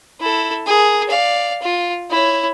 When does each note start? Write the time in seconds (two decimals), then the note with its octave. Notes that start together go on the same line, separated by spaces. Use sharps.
0.20 E4 A4
0.66 G#4 A#4
1.09 D5 F5
1.62 F4
2.10 E4 C#5